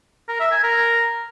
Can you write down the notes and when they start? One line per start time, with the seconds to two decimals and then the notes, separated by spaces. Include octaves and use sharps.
0.29 A#4
0.40 E5
0.52 G#5
0.63 A#4